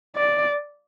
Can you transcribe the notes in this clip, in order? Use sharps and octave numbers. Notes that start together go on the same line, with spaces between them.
D5